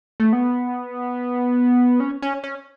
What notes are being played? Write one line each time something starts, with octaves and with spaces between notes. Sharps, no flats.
A3
B3
C#4
C#4
C#4